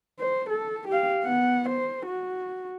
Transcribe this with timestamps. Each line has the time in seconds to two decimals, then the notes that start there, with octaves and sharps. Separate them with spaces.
0.20 C5
0.49 A4
0.88 G4 F5
1.23 B3 F#5
1.69 C5
2.06 F#4